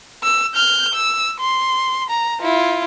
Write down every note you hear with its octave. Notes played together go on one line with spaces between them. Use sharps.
E6
F6 G6
E6
C6
A#5
E4 F4